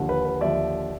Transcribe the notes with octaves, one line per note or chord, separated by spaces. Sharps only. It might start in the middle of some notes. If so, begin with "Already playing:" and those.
Already playing: D#2 D3 F3
B4
B4
D#2 D3 F3 D5 E5